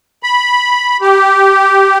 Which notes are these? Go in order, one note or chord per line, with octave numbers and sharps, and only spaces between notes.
B5
G4